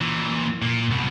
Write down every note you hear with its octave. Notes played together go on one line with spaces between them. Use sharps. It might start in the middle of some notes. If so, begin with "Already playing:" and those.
A#2 E3
A#2
C2 B2